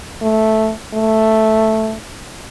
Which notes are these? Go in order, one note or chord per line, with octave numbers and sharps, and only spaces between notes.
A3
A3